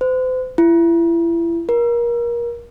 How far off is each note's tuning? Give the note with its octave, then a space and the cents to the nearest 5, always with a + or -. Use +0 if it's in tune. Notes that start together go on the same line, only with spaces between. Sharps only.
C5 -40
E4 +30
A#4 +25